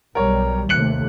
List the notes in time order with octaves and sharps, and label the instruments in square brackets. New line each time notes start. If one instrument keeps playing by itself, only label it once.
[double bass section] B1 G3 [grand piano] A#4 C#5
[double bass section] D#2 C3 A3 [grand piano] F#6 C#7 F#7